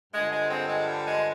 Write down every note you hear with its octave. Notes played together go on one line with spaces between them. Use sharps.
G2 D3 F3 G#3
G#3
G#3 C4
G#3
G3
G#3